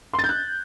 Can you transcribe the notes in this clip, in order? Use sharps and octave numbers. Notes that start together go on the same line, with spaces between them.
C6
A6
G6
F#6